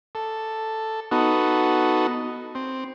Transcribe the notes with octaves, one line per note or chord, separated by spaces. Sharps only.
A4
B3 D#4 F#4 A4
C4